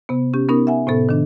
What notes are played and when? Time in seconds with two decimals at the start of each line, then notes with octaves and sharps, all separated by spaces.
0.09 C3 B3
0.34 C#4 G4
0.49 B3 C#4 D#4 A#4
0.67 E5 F#5 G#5
0.87 A2 C3 B3 A4
1.09 D#3 D4